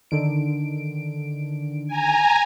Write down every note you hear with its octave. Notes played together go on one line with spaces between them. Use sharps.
D3 D#3 D7
G#5 A#5